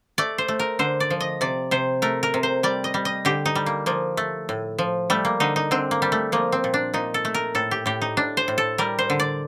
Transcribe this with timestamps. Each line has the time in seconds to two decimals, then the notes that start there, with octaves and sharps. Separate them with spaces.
0.18 A3 D5
0.38 C5
0.48 A3
0.59 A#4
0.79 D3 C5
1.00 D5
1.10 F3
1.20 D#5
1.41 C3 D5
1.71 C3 C5
2.02 A3 A#4
2.23 A#4
2.34 C3
2.43 C5
2.63 G3 D5
2.84 D#5
2.94 G3
3.05 D#5
3.25 D3 G4
3.46 D#4
3.55 G3
3.66 A#3
3.86 F3 A#3
4.17 A3
4.49 A2
4.78 F3
5.10 G3 A3
5.25 A#3
5.40 D3 D#4
5.56 D#4
5.71 D3 C4
5.91 A#3
6.02 G3
6.12 A3
6.32 F3 A#3
6.52 C4
6.64 A#2
6.74 D4
6.94 A#2 D#4
7.14 A4
7.25 A3
7.34 A#4
7.55 A2 A4
7.71 G4
7.86 A2 G4
8.01 D#4
8.17 A2 D4
8.37 C5
8.48 A2
8.58 A4
8.78 G3 A#4
8.99 C5
9.10 D3
9.20 D5